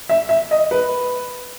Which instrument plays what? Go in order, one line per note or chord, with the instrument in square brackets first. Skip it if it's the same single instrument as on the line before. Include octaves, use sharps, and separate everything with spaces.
[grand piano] E5
E5
D#5
B4